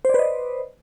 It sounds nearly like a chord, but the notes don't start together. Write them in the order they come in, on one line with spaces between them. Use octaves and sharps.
C5 D5 B4 D#5